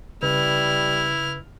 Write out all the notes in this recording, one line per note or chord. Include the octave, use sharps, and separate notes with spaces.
C#3 G3 E4 B4 F6